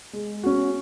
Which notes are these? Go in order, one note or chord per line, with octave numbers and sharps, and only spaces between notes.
G#3
C#4 F#4